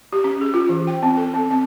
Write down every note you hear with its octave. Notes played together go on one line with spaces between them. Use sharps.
G4
C#4
G#4
F4
E3
G5
C4
A4
C4
C4